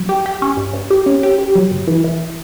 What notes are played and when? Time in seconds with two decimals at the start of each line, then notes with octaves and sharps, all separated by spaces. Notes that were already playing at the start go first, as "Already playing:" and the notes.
Already playing: F#3
0.09 G4
0.26 G4
0.42 C#4
0.57 G2
0.73 G2
0.91 G4
1.06 C#4
1.23 G4
1.38 G4
1.55 F#3
1.71 G1
1.88 E3
2.04 E3